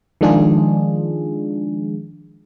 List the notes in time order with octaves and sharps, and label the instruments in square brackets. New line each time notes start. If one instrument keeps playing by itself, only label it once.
[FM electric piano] D#3 F3 G#3 D4 F4 G#4